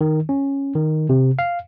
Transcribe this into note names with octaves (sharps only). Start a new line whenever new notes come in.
D#3
C#4
D#3
C3
F5